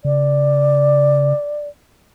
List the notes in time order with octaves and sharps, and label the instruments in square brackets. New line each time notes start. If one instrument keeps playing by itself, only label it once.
[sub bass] C#3 [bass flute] D5